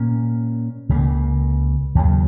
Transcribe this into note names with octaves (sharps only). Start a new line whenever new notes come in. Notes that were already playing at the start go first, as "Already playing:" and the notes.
Already playing: A#2 A#3 C#4
C#2 C#3 E3 A#3
D#2 C#3 F#3